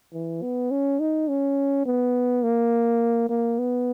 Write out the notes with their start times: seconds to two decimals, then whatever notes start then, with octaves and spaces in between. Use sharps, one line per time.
0.14 E3
0.42 B3
0.71 C#4
1.00 D#4
1.29 C#4
1.86 B3
2.44 A#3
3.30 A#3
3.59 B3